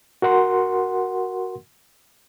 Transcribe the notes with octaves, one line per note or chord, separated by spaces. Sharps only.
F#4 A#4 F#5 C6